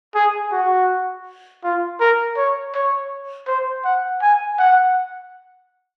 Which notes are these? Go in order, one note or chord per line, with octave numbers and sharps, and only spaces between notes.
G#4
F#4
F4
A#4
C#5
C#5
C5
F#5
G#5
F#5